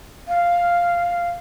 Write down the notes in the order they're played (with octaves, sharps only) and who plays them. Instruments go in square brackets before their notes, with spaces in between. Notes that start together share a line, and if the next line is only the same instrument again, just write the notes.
[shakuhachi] F5